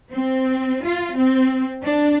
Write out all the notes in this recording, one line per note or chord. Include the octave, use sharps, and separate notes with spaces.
C4
F4
C4
D4